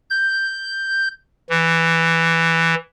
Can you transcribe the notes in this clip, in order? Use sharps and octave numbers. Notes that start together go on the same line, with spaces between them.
G6
E3